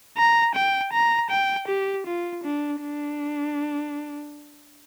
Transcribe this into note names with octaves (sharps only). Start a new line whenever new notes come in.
A#5
G5
A#5
G5
G4
F4
D4
D4